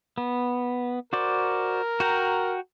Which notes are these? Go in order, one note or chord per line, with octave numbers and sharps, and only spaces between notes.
B3
F#4 A#4 C5 D5
F#4 G5 A#5